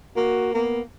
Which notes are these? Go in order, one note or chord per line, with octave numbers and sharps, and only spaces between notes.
A#3 F#4
A#3 B3